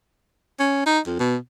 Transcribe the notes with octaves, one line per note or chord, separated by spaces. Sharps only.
C#4
D#4
F2
B2